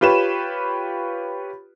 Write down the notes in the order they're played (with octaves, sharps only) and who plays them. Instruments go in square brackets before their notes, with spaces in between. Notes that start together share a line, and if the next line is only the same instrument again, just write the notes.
[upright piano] F4 G4 B4 C#5 E7